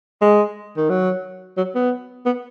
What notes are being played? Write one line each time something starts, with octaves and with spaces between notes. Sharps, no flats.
G#3
D#3
F#3
F#3
B3
B3